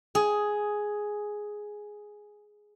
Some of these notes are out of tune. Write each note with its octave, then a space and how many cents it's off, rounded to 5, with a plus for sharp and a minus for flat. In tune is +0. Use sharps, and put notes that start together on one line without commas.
G#4 +5